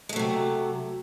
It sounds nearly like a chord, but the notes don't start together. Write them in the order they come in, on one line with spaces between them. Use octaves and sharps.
G#3 A3 F#3 C3